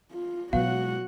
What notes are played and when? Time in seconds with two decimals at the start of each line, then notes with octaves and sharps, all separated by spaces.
0.12 F4
0.53 B2 F#3 G#3 B3 F#4 F5 F#5